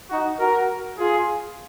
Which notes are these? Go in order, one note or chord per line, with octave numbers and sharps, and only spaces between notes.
D#4 F#4
F#4 A#4
F4 G#4